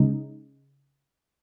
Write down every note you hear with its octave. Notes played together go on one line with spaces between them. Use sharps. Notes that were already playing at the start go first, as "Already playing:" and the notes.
Already playing: C#3 G#3 D#4